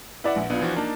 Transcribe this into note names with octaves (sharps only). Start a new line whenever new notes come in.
E4 B4 D5 E5 F#5
A#1
B1 B3 D4 F4
E3 F3 F#4
A#3 D4 D#4 A5